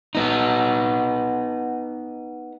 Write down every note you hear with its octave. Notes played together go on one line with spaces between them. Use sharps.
B3 D#4